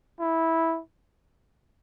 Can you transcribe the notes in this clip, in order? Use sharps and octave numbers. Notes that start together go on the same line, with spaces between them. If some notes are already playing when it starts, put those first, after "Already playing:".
E4